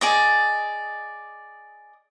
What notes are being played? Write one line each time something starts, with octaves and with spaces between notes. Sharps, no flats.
G#4 D5 D#5